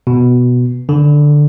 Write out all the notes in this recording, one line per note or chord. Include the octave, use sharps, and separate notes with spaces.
B2
D3